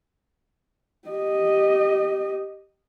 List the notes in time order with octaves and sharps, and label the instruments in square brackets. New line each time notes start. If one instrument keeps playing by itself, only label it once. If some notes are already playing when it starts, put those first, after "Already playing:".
[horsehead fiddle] G4 D#5